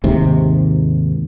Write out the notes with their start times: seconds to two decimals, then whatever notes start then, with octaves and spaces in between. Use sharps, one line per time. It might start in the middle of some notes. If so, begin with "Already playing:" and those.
0.04 D#2 G#2 C3